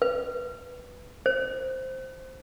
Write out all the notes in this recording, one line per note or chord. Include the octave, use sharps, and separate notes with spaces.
B4
C5